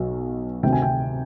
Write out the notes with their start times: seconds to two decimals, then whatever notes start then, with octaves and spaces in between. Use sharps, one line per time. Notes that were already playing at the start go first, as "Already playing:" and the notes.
Already playing: B1 B2
0.63 D2 C3 D#3 G5
0.73 G#5
0.82 G5